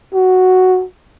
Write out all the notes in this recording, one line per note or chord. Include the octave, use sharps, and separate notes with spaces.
F#4